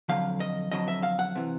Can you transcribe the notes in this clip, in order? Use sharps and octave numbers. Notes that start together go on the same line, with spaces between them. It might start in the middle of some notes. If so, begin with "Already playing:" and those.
F2 D3 F#3 F5
D#5
F2 D3 F#3 D#5
E5
F5
F#5
C3 E3